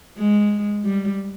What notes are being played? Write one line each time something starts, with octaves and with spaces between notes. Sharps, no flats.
G#3
G3